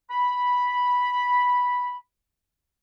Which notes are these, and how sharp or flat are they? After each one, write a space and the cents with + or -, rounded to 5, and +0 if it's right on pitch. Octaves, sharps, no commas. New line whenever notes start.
B5 -5